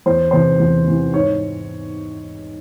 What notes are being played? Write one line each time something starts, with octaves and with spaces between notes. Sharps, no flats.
E2 C5
C3 E3 C5
E2
C3 E3
G#2 C#5